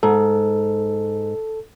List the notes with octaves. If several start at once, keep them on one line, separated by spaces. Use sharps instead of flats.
G#2 A4